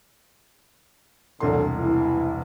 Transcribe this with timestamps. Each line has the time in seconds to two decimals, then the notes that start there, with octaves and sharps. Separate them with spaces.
1.40 E1 C2 D3 F#3 A4 C6
1.80 E3 E4